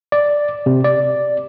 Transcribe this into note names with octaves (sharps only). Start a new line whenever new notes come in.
D5
C3
D5